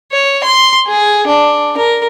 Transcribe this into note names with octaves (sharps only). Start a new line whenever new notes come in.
C#5
C6
G#4
D4
A#4